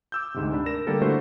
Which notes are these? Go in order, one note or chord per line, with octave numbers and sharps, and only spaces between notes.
D6 E6 G6
D2 G#2 C3
D4 B5
A#4 A#6 E7
D3 G3 A#3 G4 A4 A#4
D3 A3 E4 F#4 C5